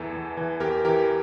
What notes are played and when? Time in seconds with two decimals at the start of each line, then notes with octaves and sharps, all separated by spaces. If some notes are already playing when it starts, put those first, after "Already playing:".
Already playing: E2 E3 A4
0.12 E2
0.37 E3
0.60 E2 G4 A#4
0.85 E3 G4 A#4